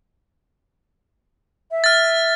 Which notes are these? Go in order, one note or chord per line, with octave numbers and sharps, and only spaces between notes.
E5
F6 A6